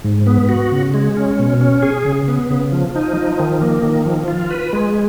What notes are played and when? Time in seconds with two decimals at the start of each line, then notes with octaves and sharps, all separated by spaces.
0.04 G#2
0.27 B3
0.49 F#4
0.72 C#3
0.94 G#3
1.17 C#4
1.39 B2
1.61 C#4
1.83 G#4
2.05 C#3
2.28 B3
2.50 C#3
2.72 F3
2.95 D#4
3.17 F3
3.40 D#3
3.62 A#3
3.83 D#3
4.06 F3
4.28 F4
4.51 B4
4.73 G#3